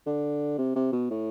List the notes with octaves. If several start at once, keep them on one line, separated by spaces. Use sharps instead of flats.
D3
C3
C3
B2
A2